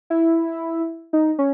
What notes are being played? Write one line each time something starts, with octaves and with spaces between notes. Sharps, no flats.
E4
D#4
C#4